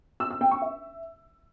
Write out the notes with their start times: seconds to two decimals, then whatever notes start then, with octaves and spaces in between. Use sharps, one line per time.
0.20 E6
0.31 E6
0.41 G5
0.51 C#6
0.62 E5